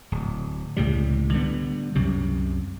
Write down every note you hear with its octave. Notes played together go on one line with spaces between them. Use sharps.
D1
C#2 A2 C3 G3
D3 G3 B3
C2 F#2 C3